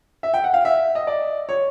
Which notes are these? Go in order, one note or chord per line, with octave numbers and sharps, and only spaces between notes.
E5
G5
F#5
F5
E5
D#5
D5
C#5